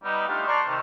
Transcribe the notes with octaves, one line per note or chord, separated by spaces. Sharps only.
G3 B3 D#4
A3 D4 D#4 F4 G4 F5
D5 A5 A#5 C6 C#6
C3 D#3